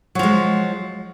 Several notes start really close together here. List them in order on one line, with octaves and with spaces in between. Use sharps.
F#3 F3 G#3